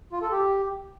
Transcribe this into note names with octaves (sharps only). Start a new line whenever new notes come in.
F4
A4
G4